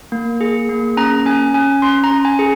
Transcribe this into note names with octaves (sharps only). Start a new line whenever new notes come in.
A#3
G#4
A#3
C#4 A#5
C#4 G#5
C#4 G#5
C#4 C6
A#5
C#4
G#5
G#4